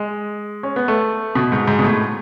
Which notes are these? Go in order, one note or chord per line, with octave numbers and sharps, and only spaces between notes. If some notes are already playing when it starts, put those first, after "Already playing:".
Already playing: G#3
C#4
B3
A3
B2
G#2
G#2
B2
A2